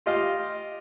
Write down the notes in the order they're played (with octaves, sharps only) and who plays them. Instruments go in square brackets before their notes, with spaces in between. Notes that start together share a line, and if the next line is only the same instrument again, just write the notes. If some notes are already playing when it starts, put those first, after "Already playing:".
[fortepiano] F4 G4 D#5 F5